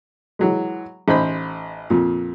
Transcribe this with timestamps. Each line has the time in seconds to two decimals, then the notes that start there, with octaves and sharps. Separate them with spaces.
0.39 E3 F#3 G#3
1.08 A1 D#4 C5 B5
1.90 F2 A#2